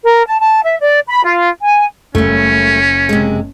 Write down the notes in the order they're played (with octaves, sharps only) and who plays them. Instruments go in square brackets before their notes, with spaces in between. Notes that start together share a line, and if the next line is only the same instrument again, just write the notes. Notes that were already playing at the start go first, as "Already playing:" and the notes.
[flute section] A#4
A5
A5
E5
D5
B5
F4
G#5
[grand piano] F#1 [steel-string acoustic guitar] G3 A3 [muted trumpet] C#4
[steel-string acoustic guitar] C3 G#3